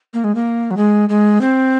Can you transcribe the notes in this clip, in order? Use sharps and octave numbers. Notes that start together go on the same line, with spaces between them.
A#3
G#3
A#3
F#3
G#3
G#3
C4